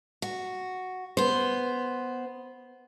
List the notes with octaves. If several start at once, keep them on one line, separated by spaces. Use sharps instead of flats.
F#4
B3 C5